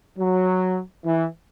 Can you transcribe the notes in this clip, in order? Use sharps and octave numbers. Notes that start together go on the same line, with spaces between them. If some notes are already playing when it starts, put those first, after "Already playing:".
F#3
E3